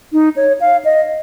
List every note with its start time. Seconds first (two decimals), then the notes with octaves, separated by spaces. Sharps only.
0.13 D#4
0.36 C#5
0.60 F5
0.85 D#5